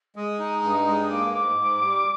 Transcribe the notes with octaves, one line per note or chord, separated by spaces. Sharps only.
G#3 D#6
D#4
G2
G#3
A#3 D6
G#2 D6
G#2
G3